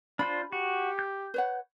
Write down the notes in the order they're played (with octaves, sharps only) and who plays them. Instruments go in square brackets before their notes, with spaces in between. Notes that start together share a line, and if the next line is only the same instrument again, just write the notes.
[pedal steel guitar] D4 F4 C5 [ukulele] B5
[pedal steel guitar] F#4 [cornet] G4
[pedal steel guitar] G6
[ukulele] B4 C#5 F#5